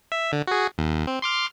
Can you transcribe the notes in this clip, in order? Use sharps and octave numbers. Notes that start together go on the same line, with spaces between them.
E5
D3
F#4 G#4
D#2
C4
C6 D6 F6